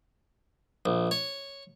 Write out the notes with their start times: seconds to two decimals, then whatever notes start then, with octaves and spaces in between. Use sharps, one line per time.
0.86 A#1
1.11 C#5